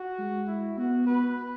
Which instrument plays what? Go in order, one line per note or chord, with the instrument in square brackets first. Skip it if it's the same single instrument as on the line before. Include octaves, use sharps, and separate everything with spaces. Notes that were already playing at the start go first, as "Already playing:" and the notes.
Already playing: [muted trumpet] F#4
[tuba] G#3
[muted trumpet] E4
[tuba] B3 [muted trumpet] F#4
[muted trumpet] B4